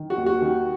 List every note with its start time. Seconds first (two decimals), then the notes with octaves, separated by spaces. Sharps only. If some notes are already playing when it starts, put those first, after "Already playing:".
Already playing: D#3
0.10 F#4
0.18 D#2
0.26 F#4
0.42 D#3